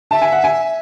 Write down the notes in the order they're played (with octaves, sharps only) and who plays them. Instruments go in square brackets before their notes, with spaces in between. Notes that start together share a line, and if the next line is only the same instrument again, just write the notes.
[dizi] E5 [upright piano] A5
[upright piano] G#5
F#5
G#5